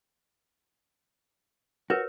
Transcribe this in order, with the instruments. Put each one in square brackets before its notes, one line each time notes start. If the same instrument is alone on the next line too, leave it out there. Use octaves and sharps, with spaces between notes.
[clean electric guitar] F#4 [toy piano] A#4 B4 C#5